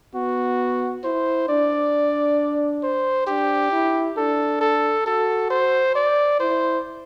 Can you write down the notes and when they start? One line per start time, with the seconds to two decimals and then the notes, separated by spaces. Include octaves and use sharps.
0.15 B3 F#4
1.04 E4 C5
1.49 D4 D5
2.83 C5
3.27 D4 G4
3.72 E4
4.17 D4 A4
4.61 A4
5.06 F#4 A4
5.50 C5
5.96 D5
6.40 E4 C5